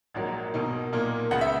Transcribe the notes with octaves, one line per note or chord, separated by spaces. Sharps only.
A#1 G#2 F#3 A#3
B1 B2 A#3 D#4
B1 A#2 A#3
C#2 C#3 G#3 B3 F#5
E5